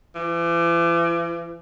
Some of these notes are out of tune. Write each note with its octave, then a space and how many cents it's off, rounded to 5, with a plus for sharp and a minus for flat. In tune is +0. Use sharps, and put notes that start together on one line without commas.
E3 +45